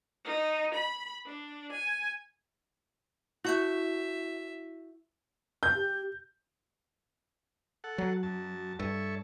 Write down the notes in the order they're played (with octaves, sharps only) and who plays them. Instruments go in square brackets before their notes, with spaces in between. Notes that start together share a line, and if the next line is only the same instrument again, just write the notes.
[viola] D#4
B5
D4
G#5
[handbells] E4 C#6 G6 [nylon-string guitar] F#4 [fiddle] E5
[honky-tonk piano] G6
[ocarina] G4
[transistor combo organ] A4 F#5
[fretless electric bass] F#3
[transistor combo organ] F#2 A5
[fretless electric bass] G2 [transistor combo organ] A4 C#5 E5